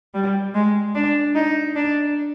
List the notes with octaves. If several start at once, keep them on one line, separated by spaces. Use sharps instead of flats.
G3
G#3
D4
D#4
D4